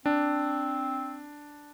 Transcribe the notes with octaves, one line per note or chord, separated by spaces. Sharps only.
C4 D4